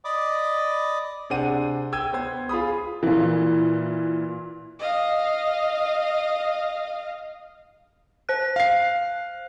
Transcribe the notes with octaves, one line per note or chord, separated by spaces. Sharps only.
D5 D#5 B5 D6 D#6
C3 D4 G#4 C5 F#5 D#7
G5 E6 G#6 D#7
B3 C5 G#6
F4 G#4 B5 D#6
A#2 E3
D#5 F5
C5 F#6
F5 C7